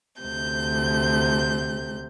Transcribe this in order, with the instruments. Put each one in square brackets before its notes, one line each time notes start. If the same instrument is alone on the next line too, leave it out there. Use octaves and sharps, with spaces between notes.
[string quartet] D2 C3 G6